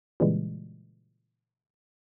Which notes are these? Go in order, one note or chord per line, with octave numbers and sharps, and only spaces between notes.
A#2 C#3 E3 G3 G#3